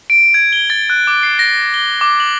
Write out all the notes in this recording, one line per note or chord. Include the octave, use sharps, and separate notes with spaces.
D7
G#6
G7
A6
F#6
D6
C7
A#6
G7
D6
F#7